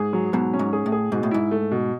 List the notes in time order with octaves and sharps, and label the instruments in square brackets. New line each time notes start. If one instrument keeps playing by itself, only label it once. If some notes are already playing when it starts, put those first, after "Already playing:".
Already playing: [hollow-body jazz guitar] G#2 [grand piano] G#4
[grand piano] F#3
[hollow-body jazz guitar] G#2 B2 [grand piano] F#3
[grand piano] C#4
[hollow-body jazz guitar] G#2
[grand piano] G#4
[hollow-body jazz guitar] A2
[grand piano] G#4
[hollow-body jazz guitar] G#2 [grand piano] B2
[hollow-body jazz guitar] A2
[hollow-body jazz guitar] G#2 [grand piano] E4
[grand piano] A3
B2